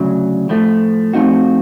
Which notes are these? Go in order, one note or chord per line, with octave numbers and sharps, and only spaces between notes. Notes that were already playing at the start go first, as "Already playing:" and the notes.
Already playing: D2 C#3 F#3
A2 F3 A3
F3 A3 C4 D#4 F#4